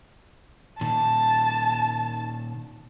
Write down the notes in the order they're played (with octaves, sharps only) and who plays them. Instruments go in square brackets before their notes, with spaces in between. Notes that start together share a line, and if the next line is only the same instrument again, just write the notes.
[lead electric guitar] A#2 D#3 [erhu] A5